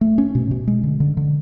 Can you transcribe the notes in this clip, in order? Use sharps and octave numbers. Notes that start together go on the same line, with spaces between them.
A3
C#4
B2
B2
G#3
D3
D3
D3